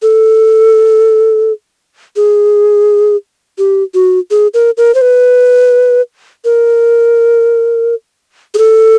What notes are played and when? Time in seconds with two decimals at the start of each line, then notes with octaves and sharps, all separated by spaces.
0.02 A4
2.16 G#4
3.58 G4
3.94 F#4
4.31 G#4
4.54 A#4
4.77 A#4
4.95 C5
5.01 B4
6.45 A#4
8.54 G#4
8.58 A4